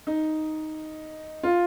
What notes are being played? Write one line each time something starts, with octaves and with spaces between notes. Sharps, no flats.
D#4
F4